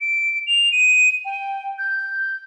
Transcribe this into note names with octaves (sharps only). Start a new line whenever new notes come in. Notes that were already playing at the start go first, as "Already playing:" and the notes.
D7
F7
D#7
G5
G6
G6